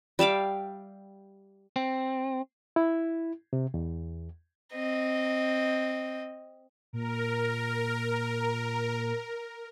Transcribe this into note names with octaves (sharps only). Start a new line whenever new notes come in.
G3 E5 F5 D6
C4
E4
C3
E2
C4 D#5
A#2 A#4